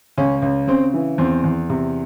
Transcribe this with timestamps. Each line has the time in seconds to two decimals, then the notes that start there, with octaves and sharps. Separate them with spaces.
0.18 C#2 C#4
0.42 C#2
0.67 C#3 C4
0.94 E3
1.18 E2 C4
1.44 E2
1.70 C3